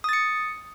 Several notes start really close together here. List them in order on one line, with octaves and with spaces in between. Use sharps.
D#6 A6 C#7